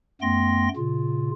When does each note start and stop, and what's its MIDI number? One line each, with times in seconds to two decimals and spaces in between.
0.22 0.68 42
0.22 0.68 57
0.22 0.68 59
0.22 0.68 79
0.22 0.68 84
0.22 0.68 94
0.77 1.31 46
0.77 1.31 49
0.77 1.31 65